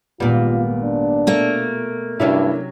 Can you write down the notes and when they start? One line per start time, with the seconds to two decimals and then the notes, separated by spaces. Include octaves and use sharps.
0.20 G#1 A#2 G3 B3 F4
0.83 D4
1.27 B2 A3 A#3
2.20 G2 C3 F#3 C#4 D4 E4 E5